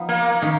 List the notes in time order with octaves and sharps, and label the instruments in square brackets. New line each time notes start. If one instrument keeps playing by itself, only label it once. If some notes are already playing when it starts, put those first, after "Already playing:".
Already playing: [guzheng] F3 B3 D#4
[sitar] A#3
[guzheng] D#3 A#3 C#4